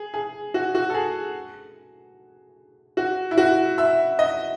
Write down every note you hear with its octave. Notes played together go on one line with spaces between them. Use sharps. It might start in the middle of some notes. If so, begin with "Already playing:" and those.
Already playing: G#4
G#4
F#4
F#4
A4
G#4
F#4
E4
F#4
E5
D#5